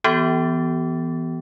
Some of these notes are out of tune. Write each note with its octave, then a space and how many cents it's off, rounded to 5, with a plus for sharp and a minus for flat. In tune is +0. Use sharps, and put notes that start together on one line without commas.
E3 +0 B3 +0 F#4 +45